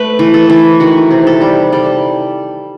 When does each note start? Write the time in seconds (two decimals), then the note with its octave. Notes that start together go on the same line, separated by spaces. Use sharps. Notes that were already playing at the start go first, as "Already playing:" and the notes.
Already playing: A3 B4
0.19 E3
0.34 A4
0.50 E3
0.80 D#3 F#4
1.11 C3
1.27 A4
1.41 G3
1.72 G3 A4